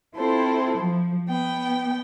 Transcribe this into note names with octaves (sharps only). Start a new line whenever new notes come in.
C4 E4 F4 A4 C5
F3
B3 G5